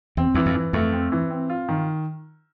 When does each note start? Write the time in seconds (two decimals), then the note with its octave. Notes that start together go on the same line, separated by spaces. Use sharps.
0.17 E2 C4
0.35 E2 E3
0.46 F2
0.55 E3
0.73 F2 A3
0.93 C4
1.12 E3
1.31 C4
1.50 F4
1.69 D#3